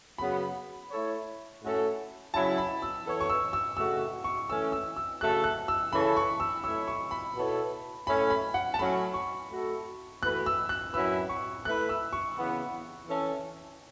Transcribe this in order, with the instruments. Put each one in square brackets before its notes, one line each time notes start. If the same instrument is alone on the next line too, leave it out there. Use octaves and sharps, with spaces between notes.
[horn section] F#2 C#3 F#3 B3 [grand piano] B5
[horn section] A3 E4 A4 C#5
A2 A3 C#4 F#4 A4
[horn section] C#3 F#3 C#4 E4 [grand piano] A5
[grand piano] B5
E6
[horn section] E3 B3 A4 C#5
[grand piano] C#6
E6
E6
[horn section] C#3 A3 F#4 [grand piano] E6
[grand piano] C#6
[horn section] E3 A3 C#4 [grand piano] E6
[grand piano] E6
E6
[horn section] C#3 A3 F#4 A4 [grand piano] F#6
[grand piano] F#6
E6
[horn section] C#3 E3 C#4 A4 C#5 [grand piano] B5
[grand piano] C#6
E6
[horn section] A3 E4 C#5 [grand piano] E6
[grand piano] C#6
B5
[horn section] B2 B3 E4 A4 C#5
[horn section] A2 A3 C#4 [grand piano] B5
[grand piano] B5
F#5
A5
[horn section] A2 F#3 A3 C#4 [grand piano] B5
[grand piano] C#6
[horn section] A3 F#4 A4
[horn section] E3 A3 F#4 B4 [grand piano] F#6
[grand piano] E6
F#6
[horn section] F#2 F#3 C#4 E4 B4 [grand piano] E6
[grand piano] C#6
[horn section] A3 E4 B4 [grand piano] F#6
[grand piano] E6
C#6
[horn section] C#3 E3 B3
E3 C#4 A4